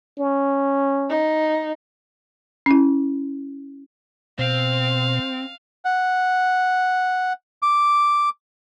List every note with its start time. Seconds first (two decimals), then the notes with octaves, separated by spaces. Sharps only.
0.19 C#4
1.10 D#4
2.66 C#4 E4
4.39 B2 C4 F5
5.85 F#5
7.62 D6